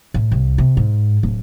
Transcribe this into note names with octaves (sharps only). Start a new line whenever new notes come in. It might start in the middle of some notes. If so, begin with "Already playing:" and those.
A2
C2
C3
G#2
D1